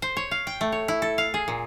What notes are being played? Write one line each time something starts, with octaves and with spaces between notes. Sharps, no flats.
C5
C#5
F5
G5
A3
C#5
E4
A4
F5
G#4
A#2